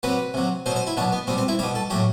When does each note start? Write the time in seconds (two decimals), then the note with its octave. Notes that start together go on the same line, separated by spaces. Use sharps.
0.03 C3 F#3 B4
0.34 C3 F#3
0.66 B2 F#3 C5
0.76 C5
0.87 E4
0.97 B2 F#3 D4
1.12 B3
1.27 B2 G3 C4
1.38 C4
1.48 E4
1.59 G3 G4
1.63 B2
1.75 A4
1.90 A2 F#3 G4